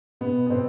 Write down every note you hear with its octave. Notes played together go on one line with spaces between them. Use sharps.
B2 B3
B3
B2 C4